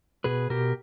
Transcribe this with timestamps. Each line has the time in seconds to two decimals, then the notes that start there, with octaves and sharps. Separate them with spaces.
0.24 B2 G#4 B4
0.50 B2 G4 A#4